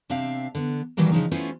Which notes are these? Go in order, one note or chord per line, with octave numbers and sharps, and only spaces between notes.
C3 C4 D4 E5 F5
D3 B3
A#2 D#3 E3 F#3 G3 A#3
C#3 F3 D4 D#4
A3 B3 C#4 E4 F4 C5